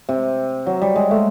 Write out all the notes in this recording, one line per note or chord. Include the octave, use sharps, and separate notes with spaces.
C3
F#3
G3
G#3
A3